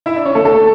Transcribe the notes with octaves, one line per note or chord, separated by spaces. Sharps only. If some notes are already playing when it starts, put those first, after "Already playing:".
E4 E5
D4 D5
C#4 C#5
A3 A4
A3 A4